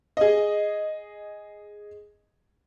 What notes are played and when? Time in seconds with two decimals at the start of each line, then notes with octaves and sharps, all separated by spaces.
0.17 G#4 D#5